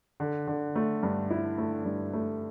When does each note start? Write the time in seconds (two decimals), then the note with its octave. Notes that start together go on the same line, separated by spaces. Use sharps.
0.20 D3
0.47 D3
0.75 A3
1.03 G2
1.30 E4
1.58 A3
1.85 G2
2.13 A3